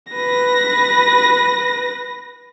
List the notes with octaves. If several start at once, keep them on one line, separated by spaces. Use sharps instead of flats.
B4 A#6